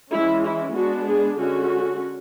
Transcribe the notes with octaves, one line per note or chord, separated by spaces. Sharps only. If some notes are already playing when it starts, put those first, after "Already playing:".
E3 G#3 C#4 E4
E4
G#3 B3 D4 F#4
G#4
D3 G#3 C#4 F#4